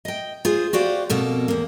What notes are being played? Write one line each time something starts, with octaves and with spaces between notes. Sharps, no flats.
D#5 G5
F4 G#4 C5
F#4 G4 C5 D5 F5
F2 B2 A#3 A4
E2 A#3